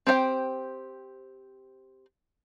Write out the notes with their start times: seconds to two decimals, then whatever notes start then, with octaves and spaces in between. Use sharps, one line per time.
0.07 C4 G4 C5 G5